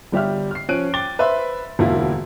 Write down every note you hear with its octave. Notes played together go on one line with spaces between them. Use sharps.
G1 G3 G4 E5 F6
F6 C7
F3 C#4 F#6 D7 D#7
G5 D6 A6 G7
B4 C5 E5 B5 C6
E1 D2 A#3 E4 F4